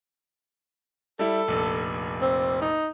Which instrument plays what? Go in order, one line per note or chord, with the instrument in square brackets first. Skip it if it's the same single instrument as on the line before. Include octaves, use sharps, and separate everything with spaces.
[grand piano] G3 E4 [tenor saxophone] A4
[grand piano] F1 A#1
[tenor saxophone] C4
D#4